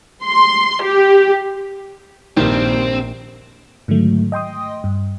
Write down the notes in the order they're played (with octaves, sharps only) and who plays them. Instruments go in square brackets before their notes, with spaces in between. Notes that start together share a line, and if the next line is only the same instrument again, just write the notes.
[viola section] C6
G4
[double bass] A#1 [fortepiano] G2 D#3 [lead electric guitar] C4 [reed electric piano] D4 G4
[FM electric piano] G#2 D3 D#3 F#3 A3
D#5 G5 C6 D#6
G2